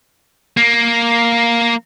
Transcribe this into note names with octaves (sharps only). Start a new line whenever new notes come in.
A#3